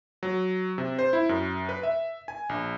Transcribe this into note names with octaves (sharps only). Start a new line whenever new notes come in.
F#3
C3
C5
E4
F#2
B4
E5
G#5
A#1